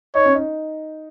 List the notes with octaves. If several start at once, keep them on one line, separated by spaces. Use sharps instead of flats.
D#4 C#5
C#4
D#4